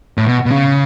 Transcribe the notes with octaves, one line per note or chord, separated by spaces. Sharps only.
A2
B2
B2
C#3